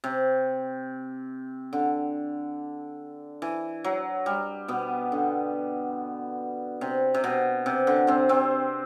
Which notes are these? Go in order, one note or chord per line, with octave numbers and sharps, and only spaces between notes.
C3
D3
E3
F#3
G3
B2 B3
D3
C3
C3
B2
C3
D3
C3 C4
C3 C4